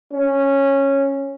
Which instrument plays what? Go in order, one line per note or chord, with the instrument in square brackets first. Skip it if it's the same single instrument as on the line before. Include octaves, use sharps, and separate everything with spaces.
[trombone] C#4